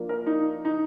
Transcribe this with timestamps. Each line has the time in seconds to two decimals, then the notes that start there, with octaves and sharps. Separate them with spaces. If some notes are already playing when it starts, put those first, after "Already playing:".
Already playing: F3 A#3 D4
0.09 A#4
0.26 D#4
0.65 D#4